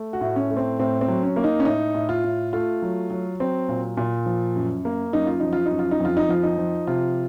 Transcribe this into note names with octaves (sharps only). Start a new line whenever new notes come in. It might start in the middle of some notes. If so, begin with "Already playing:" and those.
Already playing: A3
F#4
A2
C#4
A3
C4
A2 C4
C4
F#3
C#4
A#3
D#4
C#4
A2 D#4
A2
F4
A2
A3 F4
F#3
F#3
F#3 C4
A#2
A#2
F3
F#2
A#3
F#2 D#4
F4
F3 D#4
F4
D#4
F#2
F4
D#4
F2 F4
D#4
F3 F4
D#4
F3
C3 F4